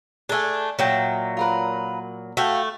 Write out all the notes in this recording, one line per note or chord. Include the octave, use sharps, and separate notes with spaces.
A3 D4 G#4 A4 G#5
A#2 F#3 E5 G5
F4 A#4 B4
A3 F#4 F5 G5